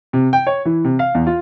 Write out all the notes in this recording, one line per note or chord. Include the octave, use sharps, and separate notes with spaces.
C3
G5
C#5
E3
C3
F5
E2
F4